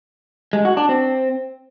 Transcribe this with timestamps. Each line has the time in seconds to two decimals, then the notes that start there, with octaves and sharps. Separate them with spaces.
0.53 G#3
0.65 F#4
0.77 D4
0.89 C4